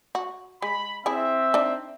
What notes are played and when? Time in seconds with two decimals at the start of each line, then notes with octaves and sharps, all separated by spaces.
0.15 F#4
0.62 G#3 B5
1.06 C4 E4 G#4 E5
1.54 D4 D#4